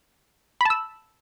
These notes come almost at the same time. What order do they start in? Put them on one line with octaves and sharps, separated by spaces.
B5 A5 E6